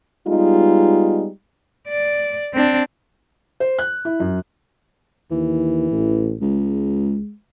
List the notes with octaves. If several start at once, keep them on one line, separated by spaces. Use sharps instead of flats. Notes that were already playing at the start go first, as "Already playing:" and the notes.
G3 G#3 B3 D#4 F4
D5
C4 D4
C5
F#6
E4
F#2
D#2 E3
A1
C#2 G#3